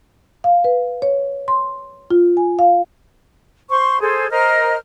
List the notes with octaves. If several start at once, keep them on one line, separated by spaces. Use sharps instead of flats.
F5
B4
C#5
C6
F4
G#5
F5
C5 C6 C#6
G#4 A4 C5
A#4 C5 D#5 F6